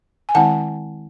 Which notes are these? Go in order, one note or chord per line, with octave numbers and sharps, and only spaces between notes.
G#5
D#3 G#3 C4 E4 F#5 A5